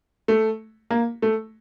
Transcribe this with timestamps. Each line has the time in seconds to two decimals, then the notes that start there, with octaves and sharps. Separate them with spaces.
0.28 A3
0.91 A#3
1.22 A3